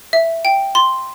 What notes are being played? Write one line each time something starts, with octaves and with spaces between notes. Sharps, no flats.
E5
G5
C6